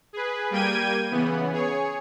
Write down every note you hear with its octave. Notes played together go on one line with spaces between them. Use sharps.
G#4 B4
G3 A#3 G5 G#6 D#7
C#3 E3 B3
G#4 C#5